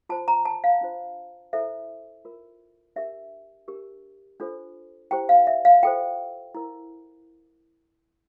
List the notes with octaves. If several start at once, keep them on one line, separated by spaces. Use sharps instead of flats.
F4 C5 A5
A#5
A5
F5
D4 F4 C5
E4 A4 C5 E5
F4 A#4
D4 G4 A#4 E5
D4 G4 A#4
D4 F4 A4 C5
E4 G4 C5 G5
F5
E5
F5
F4 A4 C5 G5
E4 A#4